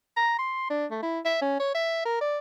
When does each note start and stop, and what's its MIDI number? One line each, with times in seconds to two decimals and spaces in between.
0.17 0.35 82
0.39 0.68 84
0.70 0.86 62
0.91 0.99 57
1.03 1.20 64
1.25 1.37 76
1.42 1.56 61
1.60 1.70 73
1.74 2.01 76
2.05 2.20 70
2.21 2.39 74